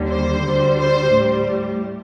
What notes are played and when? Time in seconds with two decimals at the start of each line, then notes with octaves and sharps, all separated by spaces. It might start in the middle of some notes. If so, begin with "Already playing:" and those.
Already playing: D#2 D3 G3
0.10 C5
0.43 D2 D3 G3
0.78 C5
1.12 A2 G3